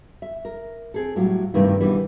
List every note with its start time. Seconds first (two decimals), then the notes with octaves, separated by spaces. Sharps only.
0.22 E5
0.45 A#4
0.94 C4 G#4 A4
1.16 A2 F#3 G3 F4
1.54 G2 C3 D#3 E3 A3
1.80 B2 D#3 E3 G3